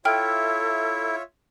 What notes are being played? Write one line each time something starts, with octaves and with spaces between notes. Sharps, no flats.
E4 F4 A4 C#5 E5 G5 F6